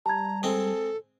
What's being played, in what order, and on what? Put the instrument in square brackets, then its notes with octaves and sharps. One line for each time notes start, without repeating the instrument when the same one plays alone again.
[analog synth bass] G3 [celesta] A5 G#6 [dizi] A#5
[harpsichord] G#3 C4 [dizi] A4